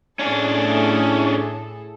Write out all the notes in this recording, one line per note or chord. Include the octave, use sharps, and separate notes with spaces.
A2 C#4 D4 G#4 A4